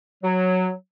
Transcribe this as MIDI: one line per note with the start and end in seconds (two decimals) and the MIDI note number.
0.23 0.70 54